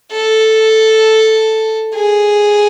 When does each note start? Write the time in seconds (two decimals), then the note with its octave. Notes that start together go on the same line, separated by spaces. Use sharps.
0.12 A4
1.94 G#4